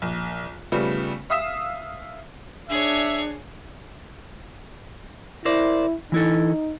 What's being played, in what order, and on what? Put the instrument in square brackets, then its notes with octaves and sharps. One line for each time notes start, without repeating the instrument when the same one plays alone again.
[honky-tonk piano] A#1
C#3 F3 G3 A3 B3
E5 F5 D#6 E6 B6 E7
[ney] D4 [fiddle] G#4 C#5 [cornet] E5
[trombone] E4 [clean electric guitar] A#4 C5 D5
[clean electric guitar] E3 E4 A4 [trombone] D#4